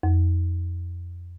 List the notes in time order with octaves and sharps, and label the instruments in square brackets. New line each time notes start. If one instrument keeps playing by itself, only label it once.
[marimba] F2